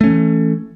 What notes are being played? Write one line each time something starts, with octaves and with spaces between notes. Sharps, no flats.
E3 A3 C#4